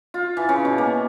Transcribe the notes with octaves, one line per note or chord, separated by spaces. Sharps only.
F4
E3
C#3
B2
A#3